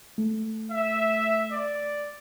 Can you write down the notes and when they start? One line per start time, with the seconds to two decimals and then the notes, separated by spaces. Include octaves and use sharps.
0.18 A3
0.69 E5
1.51 D5